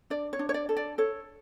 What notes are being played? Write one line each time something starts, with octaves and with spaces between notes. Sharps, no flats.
D4 D5
C#5
D4
C#5
D5
A4
D5
A4 C#5